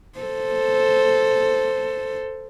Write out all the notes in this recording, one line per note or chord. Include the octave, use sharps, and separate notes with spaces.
A4 C5